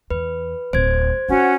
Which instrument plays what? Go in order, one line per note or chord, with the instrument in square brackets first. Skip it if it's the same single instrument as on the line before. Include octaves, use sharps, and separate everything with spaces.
[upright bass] E2 [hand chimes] B4
[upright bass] D1 D4 [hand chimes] C5 G#6
[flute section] C#4 F#4 F#5 [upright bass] D4 E4